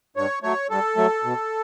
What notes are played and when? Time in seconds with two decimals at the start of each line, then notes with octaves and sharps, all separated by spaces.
0.17 G2 C#5
0.43 F#3 A3 C#5
0.70 G2 A4
0.97 F#3 A3
1.24 B2